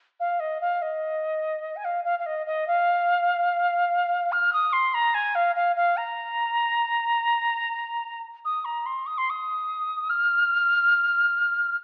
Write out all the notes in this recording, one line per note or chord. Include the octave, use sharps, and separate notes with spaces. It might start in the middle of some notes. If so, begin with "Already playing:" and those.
F5
D#5
F5
D#5
G#5
F5
F5
F5
D#5
D#5
F5
F6
D#6
C6
A#5
G#5
F5
F5
F5
A#5
D#6
A#5
C6
D#6
C6
D#6
F6